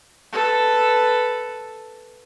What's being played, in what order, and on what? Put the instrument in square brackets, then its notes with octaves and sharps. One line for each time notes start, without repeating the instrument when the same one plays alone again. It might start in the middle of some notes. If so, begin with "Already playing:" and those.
[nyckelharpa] A4 B4